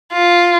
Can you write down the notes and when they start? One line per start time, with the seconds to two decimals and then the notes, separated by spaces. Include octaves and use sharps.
0.12 F4